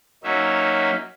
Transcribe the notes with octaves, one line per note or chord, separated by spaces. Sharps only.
F#3 A#3 C#4 D#4 E5